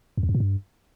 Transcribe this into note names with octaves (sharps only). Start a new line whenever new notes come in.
F2
E2
F#2
A#2
G2